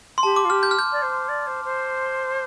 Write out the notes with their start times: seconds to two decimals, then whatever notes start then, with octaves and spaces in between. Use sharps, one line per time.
0.18 C6
0.23 G4 A5
0.36 D6
0.45 F4
0.50 G4 F6
0.63 G6
0.71 F6
0.79 G6
0.92 D5
1.02 C5
1.28 D5
1.47 C5
1.65 C5